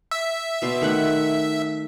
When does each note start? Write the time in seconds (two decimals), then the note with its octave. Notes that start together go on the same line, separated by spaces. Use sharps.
0.11 E5
0.62 B2 D5 C6
0.81 D#3 A3 F#5